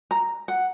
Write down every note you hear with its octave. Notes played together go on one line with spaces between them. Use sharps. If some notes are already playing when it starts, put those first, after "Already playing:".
A#5
F#5